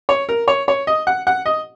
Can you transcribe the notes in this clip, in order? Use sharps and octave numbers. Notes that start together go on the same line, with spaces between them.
C#5
A#4
C#5
C#5
D#5
F#5
F#5
D#5